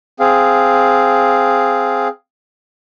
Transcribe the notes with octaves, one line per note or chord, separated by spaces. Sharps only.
C4 G#4 F5